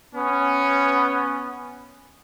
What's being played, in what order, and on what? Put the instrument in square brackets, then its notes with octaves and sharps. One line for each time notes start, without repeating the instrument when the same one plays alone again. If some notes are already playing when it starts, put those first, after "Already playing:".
[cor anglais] B3 [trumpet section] C#4